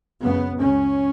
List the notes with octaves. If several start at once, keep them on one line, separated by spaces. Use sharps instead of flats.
F#2 C#3 B3
C#2 C#3 C#4